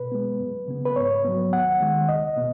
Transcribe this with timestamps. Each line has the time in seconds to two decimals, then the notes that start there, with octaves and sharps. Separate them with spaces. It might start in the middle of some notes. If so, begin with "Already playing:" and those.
Already playing: B2 B4
0.12 G#3 B3
0.40 F#2
0.68 C#3 B3
0.86 B4
0.96 G#2 C#5
1.24 F#3 B3
1.52 D#2 F#5
1.81 D#3 G#3
2.09 C#2 D#5
2.37 B2 B3